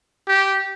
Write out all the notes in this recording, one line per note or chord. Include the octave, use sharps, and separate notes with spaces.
G4